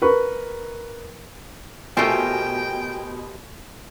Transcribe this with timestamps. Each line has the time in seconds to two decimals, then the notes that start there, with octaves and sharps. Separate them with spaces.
0.02 A#4 B4 C#6
1.97 B2 A3 F4 G4 A#4 C5 G5 G#5